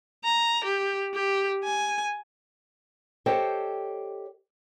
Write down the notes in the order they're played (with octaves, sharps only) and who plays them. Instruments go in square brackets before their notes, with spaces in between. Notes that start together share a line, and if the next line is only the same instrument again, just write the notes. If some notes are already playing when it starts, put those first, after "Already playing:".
[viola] A#5
G4
G4
G#5
[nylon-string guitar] G4 A4 C5 C#5 D#5 G5